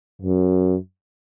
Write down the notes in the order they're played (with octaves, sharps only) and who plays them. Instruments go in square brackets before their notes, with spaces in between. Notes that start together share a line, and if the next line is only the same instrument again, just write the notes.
[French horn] F#2